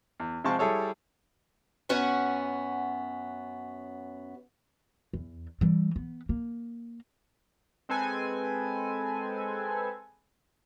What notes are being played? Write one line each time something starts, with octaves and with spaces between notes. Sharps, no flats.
E2
C3 F3 G#3 C4 A5 C#6
G3 E4 G#4 A4 C#5
F#2 B3 C#4 F#4 F#5 G#5
E2
E3 G3
B3
A#3
G#3 C4 A4 B4 G#5